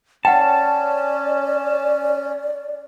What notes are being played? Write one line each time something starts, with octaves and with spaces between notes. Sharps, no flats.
C#4 D5 F#5 G5 A5